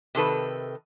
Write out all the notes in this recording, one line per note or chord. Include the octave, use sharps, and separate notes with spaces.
C3 D#3 A4 B4